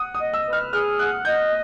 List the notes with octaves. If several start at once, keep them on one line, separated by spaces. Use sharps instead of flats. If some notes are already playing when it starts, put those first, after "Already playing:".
Already playing: F#5 D#6
D#6
D#5
E6
B4
F6
G#4 F6
F#5 F#6
D#5 G6